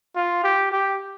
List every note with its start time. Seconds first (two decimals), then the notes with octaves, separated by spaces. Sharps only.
0.16 F4
0.44 G4
0.72 G4